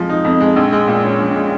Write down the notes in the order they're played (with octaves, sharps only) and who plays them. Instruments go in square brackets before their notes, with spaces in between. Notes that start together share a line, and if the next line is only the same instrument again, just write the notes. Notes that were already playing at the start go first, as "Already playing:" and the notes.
Already playing: [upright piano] F2 F3 G#3
D#4
F2
G#3
A#1
G#3
A#2
C#4
A#1
G#3